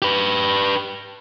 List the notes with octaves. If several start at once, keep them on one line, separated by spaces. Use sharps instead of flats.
G4 B4